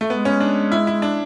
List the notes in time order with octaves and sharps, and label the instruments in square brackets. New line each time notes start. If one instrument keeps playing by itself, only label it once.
[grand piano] A3
[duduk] G#3 [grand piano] B3
[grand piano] C#4
D4
E4
E4
D4